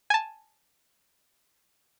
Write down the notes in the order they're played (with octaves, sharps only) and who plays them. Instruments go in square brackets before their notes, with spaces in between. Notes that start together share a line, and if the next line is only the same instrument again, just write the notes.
[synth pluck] G#5 A5